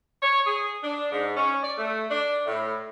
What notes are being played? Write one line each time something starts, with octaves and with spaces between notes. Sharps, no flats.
C#5
G#4
D4
G#2
C#4
D5
A3
D4
A2